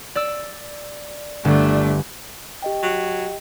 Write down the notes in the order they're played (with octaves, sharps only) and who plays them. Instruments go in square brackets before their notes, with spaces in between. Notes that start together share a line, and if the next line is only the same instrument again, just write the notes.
[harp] D5 E6
[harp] G1 [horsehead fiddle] A3 D4
[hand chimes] G4 D#5 G5
[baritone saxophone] F#3